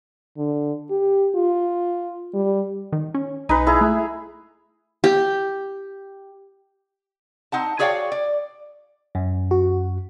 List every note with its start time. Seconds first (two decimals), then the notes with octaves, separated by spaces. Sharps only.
0.37 D3
0.90 G4
1.35 F4
2.34 G3
2.92 D#3
3.14 C#4
3.49 B1 D#4 B4 G#5
3.67 E4 G#4 A#5
3.81 A3
5.04 G4
7.52 C4 D#4 F#5 A5
7.79 F#4 G#4 C#5 D5 F5 G5
8.12 D5
9.15 F#2
9.51 F#4